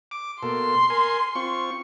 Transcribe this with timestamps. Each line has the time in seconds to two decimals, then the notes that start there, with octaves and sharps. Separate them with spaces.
0.11 D6
0.43 B2 A#3 A4 C6
0.90 A#4 G#5
1.35 C4 F4 C#6